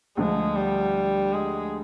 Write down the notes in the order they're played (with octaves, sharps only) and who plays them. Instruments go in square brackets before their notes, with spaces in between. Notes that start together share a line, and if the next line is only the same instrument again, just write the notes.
[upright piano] D2 D3 F3 [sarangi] G#3
[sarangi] G3
G#3